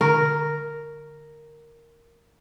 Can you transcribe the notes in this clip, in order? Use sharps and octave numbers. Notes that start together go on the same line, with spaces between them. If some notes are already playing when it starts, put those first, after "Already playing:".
D3 A#4 C#6